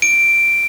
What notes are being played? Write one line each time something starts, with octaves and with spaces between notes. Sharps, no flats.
D7